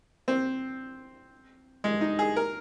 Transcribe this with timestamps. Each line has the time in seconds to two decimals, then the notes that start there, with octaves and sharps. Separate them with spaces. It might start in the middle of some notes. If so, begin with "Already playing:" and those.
0.28 C4
1.84 G#3
2.01 D#4
2.19 G#4
2.36 A#4